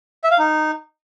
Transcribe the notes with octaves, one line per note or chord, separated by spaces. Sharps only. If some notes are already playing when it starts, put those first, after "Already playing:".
E5
F5
D#4